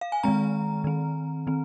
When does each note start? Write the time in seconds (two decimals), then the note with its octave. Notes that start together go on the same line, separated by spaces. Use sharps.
0.01 F5
0.12 G#5
0.23 D#3 G#3 C4 A#5
0.84 D#3 C4
1.47 D#3 C4